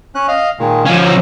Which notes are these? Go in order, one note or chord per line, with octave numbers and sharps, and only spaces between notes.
C#4 F#6
D#5 F5
A#2 D#3 G#3
F3 C#4 F5
A#5 E6